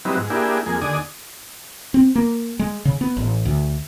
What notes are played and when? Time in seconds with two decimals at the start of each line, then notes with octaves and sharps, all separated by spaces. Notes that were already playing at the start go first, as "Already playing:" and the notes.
0.05 F#3 G3 B3 C4 D#4 E4
0.17 G#2
0.30 A#3 D4 E4 G4 G#4
0.66 F2 G#3 A#3 G#4
0.82 D#2 D3 D5 G#5 D#6
1.94 C4
2.15 A#3
2.59 G#3
2.85 C#3
3.01 B3
3.17 A1
3.45 D2